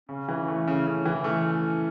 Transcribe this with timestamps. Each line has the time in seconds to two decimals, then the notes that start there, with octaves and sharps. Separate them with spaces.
0.09 C#3 C#4
0.29 E3
0.48 A3
0.68 C#3
0.86 C#3
1.06 E3
1.24 A3